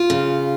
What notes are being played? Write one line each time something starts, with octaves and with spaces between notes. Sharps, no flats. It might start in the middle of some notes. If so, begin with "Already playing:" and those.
Already playing: F4
C#3